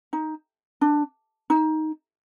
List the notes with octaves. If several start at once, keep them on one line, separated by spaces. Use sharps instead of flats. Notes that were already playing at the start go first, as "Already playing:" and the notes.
D#4
D4
D#4